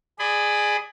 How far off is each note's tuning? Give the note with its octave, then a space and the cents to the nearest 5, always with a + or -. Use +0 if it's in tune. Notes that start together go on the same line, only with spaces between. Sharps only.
G#4 +0 D5 +25 B5 +25